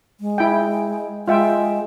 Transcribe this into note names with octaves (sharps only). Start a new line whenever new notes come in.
G#3
E4 G5
G#3 F4 E5 G5